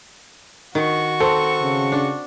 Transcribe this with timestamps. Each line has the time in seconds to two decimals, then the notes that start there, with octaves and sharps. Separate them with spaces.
0.75 D#3 F#4 C#6
1.20 C4 A4
1.62 C#3
1.92 D4